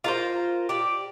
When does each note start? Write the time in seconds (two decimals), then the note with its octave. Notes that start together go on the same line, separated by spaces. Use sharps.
0.04 F4 A#4 C5
0.69 G4 D5